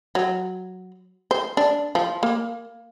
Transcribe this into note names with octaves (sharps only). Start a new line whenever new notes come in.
F#3
C5
D4
F3
A#3